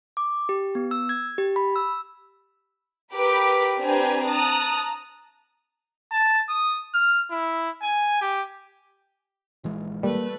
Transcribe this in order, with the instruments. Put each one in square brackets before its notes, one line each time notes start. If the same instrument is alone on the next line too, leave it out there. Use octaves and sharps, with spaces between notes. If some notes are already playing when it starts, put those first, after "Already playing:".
[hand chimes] D6
G4
B3
E6
G#6
G4
B5
E6
[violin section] G4 A#4 B4 B5 D6
C4 D4 G4 B4 G#5 A#5
A5 A#5 D#6 F#6
[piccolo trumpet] A5
D#6
F6
E4
G#5
G4
[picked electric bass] A#1 E3 G#3
[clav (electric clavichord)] G3 [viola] A3 B4 [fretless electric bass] A#3